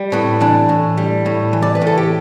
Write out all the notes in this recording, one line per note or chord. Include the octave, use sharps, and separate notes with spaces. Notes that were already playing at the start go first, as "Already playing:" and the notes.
Already playing: G3
A2 B3
E3 D4
A2
G3
A2
E3
D5
B4
A2
A4
G4